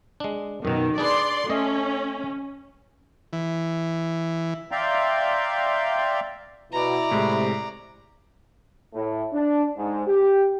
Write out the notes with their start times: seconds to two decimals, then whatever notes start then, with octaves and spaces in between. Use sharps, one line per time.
0.20 G#3 D4
0.65 F#2 B2 D#3
0.98 D4 G#4 B4 D5 C6
1.50 A3 C#4 A4 D#5
3.33 E3
4.72 D5 E5 F5 G5 A#5 C6
6.73 B2 E4 D5 A#5
7.11 A2 C3 G#3
8.94 A2
9.32 D4
9.76 G#2
10.07 G4